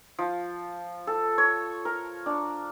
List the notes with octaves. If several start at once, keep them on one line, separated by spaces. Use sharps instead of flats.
F3
A4
C#5
A#4
D4